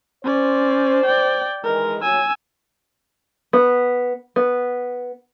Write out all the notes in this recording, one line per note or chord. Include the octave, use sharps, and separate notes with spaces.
C#4 C5 D5
D5 G5
D#3 E3 G#3 A#4
F#3 G#5 E6
B3
B3